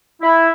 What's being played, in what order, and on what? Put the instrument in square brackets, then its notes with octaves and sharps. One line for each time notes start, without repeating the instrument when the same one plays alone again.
[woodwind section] E4